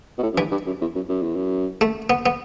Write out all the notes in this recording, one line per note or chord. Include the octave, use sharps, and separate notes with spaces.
B2
A2
F#2
G2 E3
G2
F#2
E2
F#2
F#2
E2
F#2
A3
B3
B3